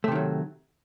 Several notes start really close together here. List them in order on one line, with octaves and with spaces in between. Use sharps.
A3 C3 D#3 F#3